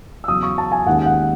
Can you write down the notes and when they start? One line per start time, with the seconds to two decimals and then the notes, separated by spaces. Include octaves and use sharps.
0.24 E6
0.28 E2 C#3 F#3 D#6
0.43 C#6
0.58 A5
0.72 G#5
0.86 D#2 D#3 G#3 C#4 F#5
1.06 F#5